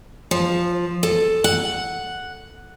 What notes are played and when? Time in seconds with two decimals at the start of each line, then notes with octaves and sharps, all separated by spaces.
0.31 F3
1.03 A4
1.44 F#5